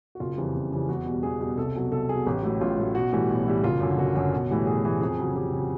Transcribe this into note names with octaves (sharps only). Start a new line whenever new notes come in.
F#4
F#1 F4
F2 C#3 E3 G3
F#1
F2 C#3 E3 G3
E2 F#4
B2 G3
E2 G#4
B2 G3
C2 A4
B2 F#3
C2 A4
B2 F#3 G#4
A1 G4
A2 F#3
A1 F4
A2 F#3
B1 F#4
A2 E3 G3
B1
A2 E3 G3
F#1 F4
F#2 D3
F#1 F#4
F#2 D3
B1
A2 E3 G3
B1 G#4
A2 E3 G3
F2 G#4
C#3 F#3
F2 G4
C#3 F#3